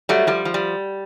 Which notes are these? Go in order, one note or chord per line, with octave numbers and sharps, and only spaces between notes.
F#3 G3 A3
F3 G3
F3
G3